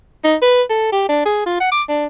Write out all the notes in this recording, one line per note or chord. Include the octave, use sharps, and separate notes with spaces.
D#4
B4
A4
G4
D4
G#4
F4
F#5
D6
D4